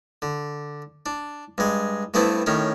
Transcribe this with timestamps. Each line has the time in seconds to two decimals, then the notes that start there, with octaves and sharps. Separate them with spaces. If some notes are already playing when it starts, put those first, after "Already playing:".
0.22 D3
1.06 D4
1.58 G2 G#3
2.14 G2 A3 B3 C4 E4
2.46 A2 D#3 C#4